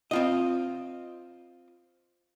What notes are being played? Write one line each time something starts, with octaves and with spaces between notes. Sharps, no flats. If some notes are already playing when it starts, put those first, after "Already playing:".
C4 F4 D#5